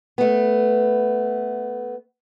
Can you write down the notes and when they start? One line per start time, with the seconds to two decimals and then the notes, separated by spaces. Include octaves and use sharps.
0.18 A3 B3